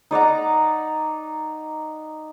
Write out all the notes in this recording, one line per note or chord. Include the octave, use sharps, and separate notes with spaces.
D#4 D5 F#5 A#5